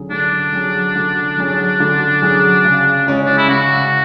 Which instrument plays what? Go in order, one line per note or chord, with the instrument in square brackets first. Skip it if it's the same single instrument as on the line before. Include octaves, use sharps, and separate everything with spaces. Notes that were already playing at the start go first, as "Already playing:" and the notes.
Already playing: [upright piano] D3 F#3 C#4 G#4
[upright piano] D3 [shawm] D4
[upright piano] F#3 C#4 G#4
D3
F#3 C#4 G#4
D3
F#3 C#4 G#4
C#3
G#3 C#4 G#4
[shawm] D4
E4
[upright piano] C#3 [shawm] F#4